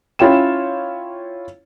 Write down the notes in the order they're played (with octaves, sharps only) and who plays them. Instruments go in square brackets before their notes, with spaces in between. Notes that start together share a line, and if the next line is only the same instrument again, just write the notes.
[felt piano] C#4 E4 F4 C#5 G5 E7